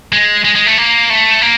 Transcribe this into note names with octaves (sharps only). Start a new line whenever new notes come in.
G#3
G#3
G#3
A3
A#3
A3
A#3